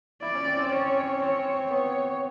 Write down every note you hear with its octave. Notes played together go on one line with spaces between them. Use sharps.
E4 D5
C#4
C4
C4
C#4 C#5
C4 C#5
C4
B3 C#5